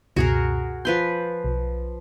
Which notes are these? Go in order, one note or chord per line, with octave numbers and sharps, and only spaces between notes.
C#2 F#2 B2 F#4 G#4 A#4
F3 B4 C6 G6
B1